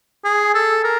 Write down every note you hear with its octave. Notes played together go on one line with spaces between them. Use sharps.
G#4
A4
A#4